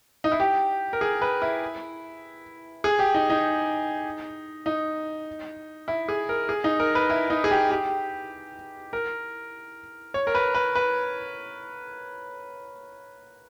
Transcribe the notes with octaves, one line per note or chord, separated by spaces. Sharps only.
D#4
E4
G4
A#4
G#4
B4
E4
G#4
G4
D#4
D#4
D#4
E4
G#4
A#4
G#4
D#4
A#4
B4
E4
D#4
G#4
G4
G4
A#4
C#5
A#4
B4
B4
B4